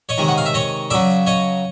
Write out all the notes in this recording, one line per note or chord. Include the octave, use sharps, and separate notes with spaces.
C#5 D#5
C3 D#3 G#3
F#5
F5
E5
C#5 D#5
C#3 F#3 D5 E5
C#5 D#5